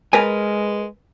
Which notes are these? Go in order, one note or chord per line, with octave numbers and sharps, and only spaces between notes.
G#3 A#4 B4 G#5